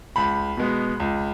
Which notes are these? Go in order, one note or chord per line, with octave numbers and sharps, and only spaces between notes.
C#2 B5
B2 G#3 B3
C#2